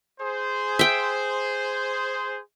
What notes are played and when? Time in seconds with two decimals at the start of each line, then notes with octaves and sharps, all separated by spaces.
0.20 G#4 C5
0.79 E5 G5